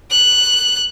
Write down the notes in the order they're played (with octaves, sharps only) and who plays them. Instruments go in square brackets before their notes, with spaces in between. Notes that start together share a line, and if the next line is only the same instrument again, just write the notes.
[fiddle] F#6